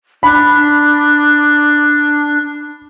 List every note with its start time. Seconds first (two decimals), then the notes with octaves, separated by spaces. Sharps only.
0.23 D4 B5